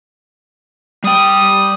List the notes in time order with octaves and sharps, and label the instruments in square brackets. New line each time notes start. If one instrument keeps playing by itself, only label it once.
[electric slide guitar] G3 G5 [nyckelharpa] D#6